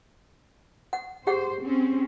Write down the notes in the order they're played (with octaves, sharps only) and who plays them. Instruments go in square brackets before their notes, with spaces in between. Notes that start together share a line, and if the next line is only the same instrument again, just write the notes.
[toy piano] F#5
[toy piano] G4 G#4 F#5 [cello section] C5
[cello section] C4 C#4